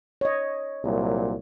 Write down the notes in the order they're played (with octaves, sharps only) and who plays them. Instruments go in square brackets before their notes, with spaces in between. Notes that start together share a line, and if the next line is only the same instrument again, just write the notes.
[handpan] C#5 D#5
[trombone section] C2 A#2 F#3